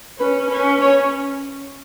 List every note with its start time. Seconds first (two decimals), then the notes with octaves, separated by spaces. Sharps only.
0.19 C#4 B4
0.50 C#4 B4
0.81 C#4 C#5